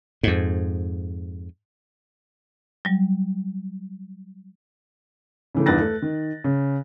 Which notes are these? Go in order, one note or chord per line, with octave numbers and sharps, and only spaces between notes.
F2 G#2
F#3 G3
C#3 E3 A3
E2 G2 D#3 F#6 A6 A#6
A3
D#3
C#3